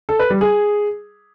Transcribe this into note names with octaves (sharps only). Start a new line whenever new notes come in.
A4
B4
G3
G#4